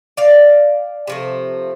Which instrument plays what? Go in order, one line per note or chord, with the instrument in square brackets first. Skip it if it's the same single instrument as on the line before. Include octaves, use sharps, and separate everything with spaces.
[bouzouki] D5 F5
C3 F3 A3